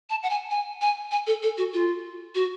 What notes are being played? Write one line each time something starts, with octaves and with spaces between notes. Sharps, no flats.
A5
F#5
G#5
G#5
G#5
G#5
A4
A4
F#4
F4
F#4